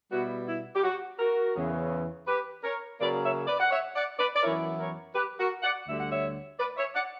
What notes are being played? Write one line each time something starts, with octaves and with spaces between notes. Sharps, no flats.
B2 G3 B3 E4 F#4
E4
G4
F#4
F#4 A#4
E2 C#3 E3
G4 B4
A#4 C#5
C#3 F#3 A#3 B4 D5
C#5 E5
B4 D5
F#5
C#5 E5
D5 F#5
B4 D5
D5
F#2 E3 B3 E4 A#4 C#5
A#4 C#5
G4 B4
F#4 A#4
D5 F#5
D2 D3 G3 E5
F#5
C#5 E5
B4 D5
C#5 E5
D5 F#5